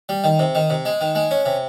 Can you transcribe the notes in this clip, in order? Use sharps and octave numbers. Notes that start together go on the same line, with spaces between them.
G3
D#3
C3
D#3
C3
G#3
D#3
G#3
C#4
C3